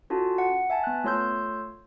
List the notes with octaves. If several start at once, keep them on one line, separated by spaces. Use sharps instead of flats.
C#4 F4 F#4 A4 A5
F#5
E5 G#5 A5
B3 F#6
A3 F4 C#5 C6 E6 G6